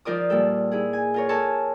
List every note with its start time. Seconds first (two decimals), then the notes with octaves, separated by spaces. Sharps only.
0.05 F3 F4 A#4 D5 D#6
0.30 A#2 G3 A4
0.71 E4 G#4
0.93 G#5
1.14 F4 A#4 C#5
1.29 A4 A#4 G#5 A5 C#6